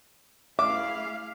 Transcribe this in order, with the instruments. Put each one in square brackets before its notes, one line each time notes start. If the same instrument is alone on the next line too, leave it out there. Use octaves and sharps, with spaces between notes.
[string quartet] A3 E4 G#4 [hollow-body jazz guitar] E5 [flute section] F5 [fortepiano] D6